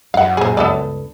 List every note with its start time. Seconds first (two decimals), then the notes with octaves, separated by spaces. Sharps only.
0.14 F#2 E4 F5 F#5
0.37 A#2 G#4 C5
0.57 C#2 G2 B3 A4 D5